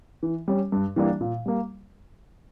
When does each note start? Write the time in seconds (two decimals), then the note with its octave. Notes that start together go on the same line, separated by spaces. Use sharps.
0.23 E3
0.48 G3 C#4
0.72 G2
0.96 E3 G3 A#3 D4
1.21 A#2
1.46 G3 A#3